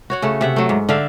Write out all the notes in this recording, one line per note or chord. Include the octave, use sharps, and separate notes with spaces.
F#4 C#5 F#5
C#3 A3
C3 E5 F#5
F#3 A3
G#2
D3 D4 E5 F5